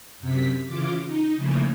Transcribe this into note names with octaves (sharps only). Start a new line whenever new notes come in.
F#2 C3 B6
C#3 E3 F4 D6
D#4
C#3 E3 F3 A3 A#3